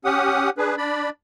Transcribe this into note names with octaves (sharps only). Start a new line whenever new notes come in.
C#4 G4 F#5 D#6
D4 G#4 B4
D4 D5 B5